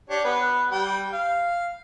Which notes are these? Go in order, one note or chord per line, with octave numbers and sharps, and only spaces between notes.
D4 G4 C#5
B3 B4
G3 G5
F5